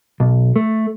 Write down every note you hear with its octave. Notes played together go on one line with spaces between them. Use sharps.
B1
A3